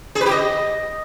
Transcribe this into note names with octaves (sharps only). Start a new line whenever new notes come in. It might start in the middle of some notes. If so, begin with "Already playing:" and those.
G#4
B4
G4
D#5